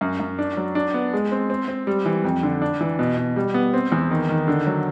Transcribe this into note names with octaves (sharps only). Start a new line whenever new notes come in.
F#2
F#2
D4
F#3
D4
B3
G#3
C4
C4
C4
G3
E3
F2
D3
D4
E3
B2
B2
G3
B3
C4
E2
D#3
D#3
D3
F#3